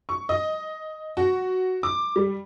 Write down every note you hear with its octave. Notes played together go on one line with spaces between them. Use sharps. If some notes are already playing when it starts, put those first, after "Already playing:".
C#6
D#5
F#4
D6
G3